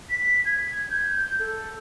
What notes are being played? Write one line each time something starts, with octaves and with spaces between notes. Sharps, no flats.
B6
G#6
G6
A4